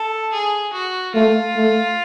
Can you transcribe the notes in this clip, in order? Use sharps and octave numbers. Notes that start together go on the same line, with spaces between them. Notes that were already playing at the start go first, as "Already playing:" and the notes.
Already playing: A4
G#4
F#4
A3 F4
A3